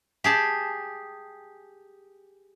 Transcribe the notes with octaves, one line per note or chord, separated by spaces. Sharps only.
G4 G#4 A5